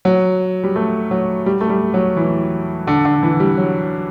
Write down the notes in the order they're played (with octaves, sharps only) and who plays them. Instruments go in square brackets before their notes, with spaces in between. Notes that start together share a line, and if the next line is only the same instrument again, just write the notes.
[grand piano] F#3
G3
A3
F#3
G3
A3
G3
F#3
E3
D3
D3
E3
G3
F#3